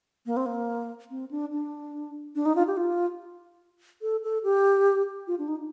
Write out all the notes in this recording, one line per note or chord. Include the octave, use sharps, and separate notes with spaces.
A#3
C4
A#3
C4
D4
D4
D4
D#4
F4
G4
F4
A4
A4
G4
F4
D4
D#4